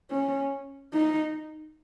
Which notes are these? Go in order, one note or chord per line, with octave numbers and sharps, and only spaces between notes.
C#4
D#4